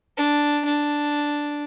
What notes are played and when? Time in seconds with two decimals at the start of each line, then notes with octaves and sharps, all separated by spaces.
0.17 D4
0.65 D4